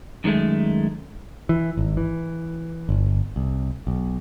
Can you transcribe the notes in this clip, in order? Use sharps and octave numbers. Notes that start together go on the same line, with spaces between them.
F#2 D#3 F3 G#3 A3
E3
G#1
E3
G1
C2
B1